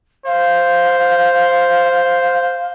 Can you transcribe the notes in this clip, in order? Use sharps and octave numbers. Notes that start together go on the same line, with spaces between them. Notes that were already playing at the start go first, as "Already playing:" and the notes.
C5 F5